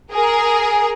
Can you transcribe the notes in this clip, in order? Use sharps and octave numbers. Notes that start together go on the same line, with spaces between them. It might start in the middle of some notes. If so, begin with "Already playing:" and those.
G#4 A#4